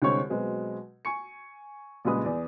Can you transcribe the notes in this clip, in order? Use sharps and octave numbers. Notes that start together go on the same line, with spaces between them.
C2 D3 G#3 C5 C#5 C#6
B2 F#3 G#3 C4
G#5 C#6 C#7
A#1 C#3 G3 G#3 B4 D#6
E2 D5